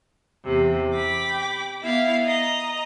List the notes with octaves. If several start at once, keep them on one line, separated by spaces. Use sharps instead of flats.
E2 C3
G5 B5 D6
B3 E4 F5
D#5 A#5